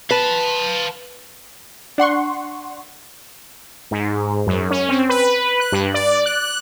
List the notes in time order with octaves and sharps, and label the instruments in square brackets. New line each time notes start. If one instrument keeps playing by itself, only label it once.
[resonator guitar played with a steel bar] B4 [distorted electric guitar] F5 A5
[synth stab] D4 F#5 C6 C#6
[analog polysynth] G#2
F#2
C#4
C4
B4
F#6
G2
D5
F#6